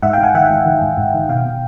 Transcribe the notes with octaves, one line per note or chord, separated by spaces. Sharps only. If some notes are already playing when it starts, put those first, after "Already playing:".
G#2 E5 F#5
F5 G5
G#2
F#5 G#5
D#3 E5 F#5
G#2
D#3
G#2
G#2
D#3
B2 F5 G5
B2